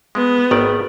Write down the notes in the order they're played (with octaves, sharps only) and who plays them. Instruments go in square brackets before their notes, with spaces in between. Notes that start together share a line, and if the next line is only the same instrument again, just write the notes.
[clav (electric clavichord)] G#3 [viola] B3
[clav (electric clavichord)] G#1 D#3 D5